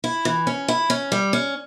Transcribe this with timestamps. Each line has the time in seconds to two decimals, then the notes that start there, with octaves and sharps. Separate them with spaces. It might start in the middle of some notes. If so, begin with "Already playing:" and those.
0.04 E4
0.25 E3
0.47 C#4
0.68 E4
0.90 C#4
1.12 G3
1.33 C#4